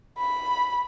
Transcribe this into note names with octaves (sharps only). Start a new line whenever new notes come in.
B5